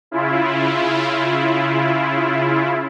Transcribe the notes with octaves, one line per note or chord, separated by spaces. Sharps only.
C#3 E4 F4